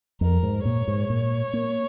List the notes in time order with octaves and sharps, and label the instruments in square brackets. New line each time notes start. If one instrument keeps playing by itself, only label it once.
[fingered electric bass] F2 [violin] A#4
[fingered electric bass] G#2
[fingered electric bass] A#2 [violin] C#5
[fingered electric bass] G#2
A#2
A#3